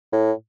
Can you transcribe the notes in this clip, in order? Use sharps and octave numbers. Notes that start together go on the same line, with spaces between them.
A2